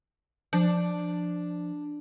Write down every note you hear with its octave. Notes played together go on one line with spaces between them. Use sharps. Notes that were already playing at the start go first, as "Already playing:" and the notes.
F3 D4